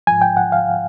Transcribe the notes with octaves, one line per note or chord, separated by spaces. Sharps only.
G#2 F3 G#5
G5
F#5
F5